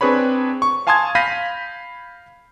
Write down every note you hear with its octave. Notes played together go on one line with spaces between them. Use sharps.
C4 D4 G#4 B4 C#5 B5
C#6
F5 G#5 A5 C6 D#6 G#6
F5 B5 G6 A#6 B6 D#7